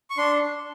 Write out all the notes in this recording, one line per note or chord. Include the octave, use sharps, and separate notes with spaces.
C#6
D4 C6